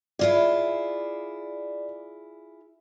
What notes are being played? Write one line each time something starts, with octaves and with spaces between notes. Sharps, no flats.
E4 F4 G#4 D5